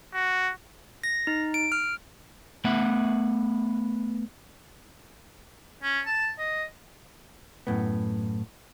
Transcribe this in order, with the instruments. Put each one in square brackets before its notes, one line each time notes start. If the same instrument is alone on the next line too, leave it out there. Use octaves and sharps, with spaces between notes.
[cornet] F#4
[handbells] A#6
D#4
D7
F6
[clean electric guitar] A3 B3 E5 F#5
[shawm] C#4
A5
D#5
[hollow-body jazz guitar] F#2 A2 B3